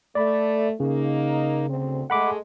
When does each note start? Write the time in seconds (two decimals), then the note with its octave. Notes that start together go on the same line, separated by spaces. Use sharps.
0.15 A3 D5 B5
0.80 C#3 A#3 D#4
1.68 D2 C4
2.10 G#3 A3 F#5 B5 D6